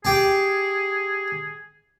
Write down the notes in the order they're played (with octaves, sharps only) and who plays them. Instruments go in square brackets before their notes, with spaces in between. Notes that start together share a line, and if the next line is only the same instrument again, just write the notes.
[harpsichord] G4 A5 [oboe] G#4